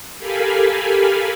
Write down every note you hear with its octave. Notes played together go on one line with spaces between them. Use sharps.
G4 A4 A#4 F5 G#5 B5